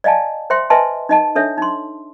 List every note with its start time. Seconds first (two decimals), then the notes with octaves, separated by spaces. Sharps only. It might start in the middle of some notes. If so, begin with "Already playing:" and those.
0.04 D5 D#5 F5 G#5 A5
0.50 C5 E5 G5 C6
0.70 B4 D#5 E5 G#5 A5 C6
1.09 D#4 D#5 A5
1.35 D4 A4 C#5 E5
1.58 D#4 C6